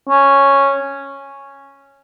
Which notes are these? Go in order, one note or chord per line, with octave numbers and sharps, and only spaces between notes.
C#4